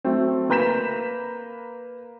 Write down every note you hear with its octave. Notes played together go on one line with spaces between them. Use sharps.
F#3 A3 C4
A#3 B4 A#5 G6 B6 E7